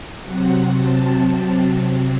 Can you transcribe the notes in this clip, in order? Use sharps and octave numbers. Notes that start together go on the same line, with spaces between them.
C3 F#3 C4 F#5
A5